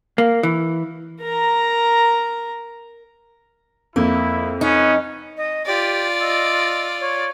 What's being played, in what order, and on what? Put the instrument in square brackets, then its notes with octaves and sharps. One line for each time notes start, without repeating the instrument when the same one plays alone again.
[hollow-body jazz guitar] A#3
E3
[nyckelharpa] A#4 A#5
[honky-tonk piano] F2 [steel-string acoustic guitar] A#3 [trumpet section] E4
[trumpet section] B3 C#4 [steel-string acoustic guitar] D#4
[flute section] D#5
[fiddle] F4 D5 [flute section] G4
[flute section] D#5 E6
C#5